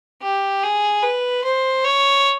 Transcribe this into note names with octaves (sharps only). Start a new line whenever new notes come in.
G4
G#4
B4
C5
C#5